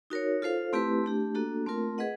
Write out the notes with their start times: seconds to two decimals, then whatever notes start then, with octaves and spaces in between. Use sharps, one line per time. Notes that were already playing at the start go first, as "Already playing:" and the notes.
0.10 D#4 F#4 A#4 C#5
0.42 F4 A4 C5 F5
0.73 A3 C4 E4 G4 B4
1.04 A3 D4 G4
1.35 A#3 D4 F#4 A4
1.66 A3 C4 F4 A#4
1.98 G#4 B4 D#5 F#5